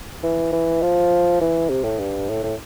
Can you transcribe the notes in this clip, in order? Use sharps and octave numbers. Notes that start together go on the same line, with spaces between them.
E3
E3
F3
E3
C3
A2
G2
A2
A2